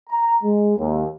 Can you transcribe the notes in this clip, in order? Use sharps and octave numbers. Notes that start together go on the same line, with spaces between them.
A#5
G#3
D#2